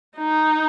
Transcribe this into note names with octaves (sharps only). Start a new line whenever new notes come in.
D#4